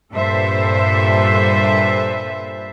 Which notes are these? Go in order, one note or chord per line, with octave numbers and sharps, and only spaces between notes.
G2 A#2 A4 B4 C5 E5